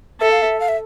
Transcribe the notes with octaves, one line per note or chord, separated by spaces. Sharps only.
A4 E5
F5
E5
F5
E5